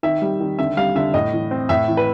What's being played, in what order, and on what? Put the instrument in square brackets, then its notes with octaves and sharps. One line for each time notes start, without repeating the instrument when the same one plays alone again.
[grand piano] D#3 E5
G3
D#3
D3 E5
G3 F5
D3 E5
A2 D#5
E3
C4
A2 E5
E3
B4